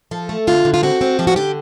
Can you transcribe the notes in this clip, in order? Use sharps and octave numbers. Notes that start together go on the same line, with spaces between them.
F3 A4
A3
D3 F4
D3
F4
C4 F#4
C4
F3 G4
F#4
D3 G4